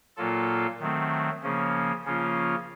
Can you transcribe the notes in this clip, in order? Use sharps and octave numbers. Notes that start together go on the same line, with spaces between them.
A#2 F#3 A#3 F4 A4
D#3 F#3 A3 C4
C#3 F3 A#3 C#4
C#3 F3 A#3 C#4 F4